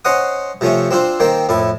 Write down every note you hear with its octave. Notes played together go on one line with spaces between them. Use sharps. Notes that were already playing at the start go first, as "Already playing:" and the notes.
C#4 C5 D#5 F#5 D#6
C3 F3 A3 C#4
C4 D4 F4 C5
D#3 A#3 C4 G5
F2 A2 E4 A5